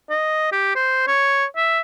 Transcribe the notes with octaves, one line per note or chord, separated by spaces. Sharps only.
D#5
G4
C5
C#5
E5